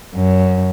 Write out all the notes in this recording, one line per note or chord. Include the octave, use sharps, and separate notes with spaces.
F#2